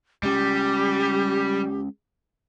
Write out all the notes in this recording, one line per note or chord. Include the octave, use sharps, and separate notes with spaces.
G3 G#3 C#4 G4